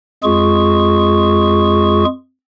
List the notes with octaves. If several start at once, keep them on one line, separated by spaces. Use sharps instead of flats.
F2 G#3 F4 G#4 C#6